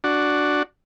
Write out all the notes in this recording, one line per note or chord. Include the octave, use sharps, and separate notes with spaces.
D4 F#4